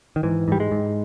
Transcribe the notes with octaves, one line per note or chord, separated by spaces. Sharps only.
D#3
G#2 E3
G#2 G3
G#3
G#2